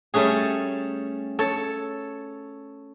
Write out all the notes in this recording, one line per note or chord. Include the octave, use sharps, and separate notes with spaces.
G3 A3 C#4 G#4
A4 C#5